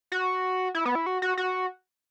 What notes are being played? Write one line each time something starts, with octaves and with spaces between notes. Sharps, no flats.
F#4
E4
B3
E4
F#4
F#4
F#4